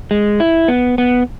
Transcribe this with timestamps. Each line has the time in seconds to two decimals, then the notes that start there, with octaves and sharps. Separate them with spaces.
0.11 G#3
0.40 E4
0.68 B3
0.98 B3